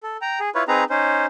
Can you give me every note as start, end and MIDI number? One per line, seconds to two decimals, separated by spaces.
0.03 0.17 69
0.21 0.39 79
0.21 0.39 82
0.40 0.50 68
0.55 0.63 64
0.55 0.63 65
0.55 0.63 71
0.55 0.63 73
0.68 0.84 60
0.68 0.84 63
0.68 0.84 68
0.68 0.84 71
0.68 0.84 82
0.90 1.26 61
0.90 1.26 63
0.90 1.26 72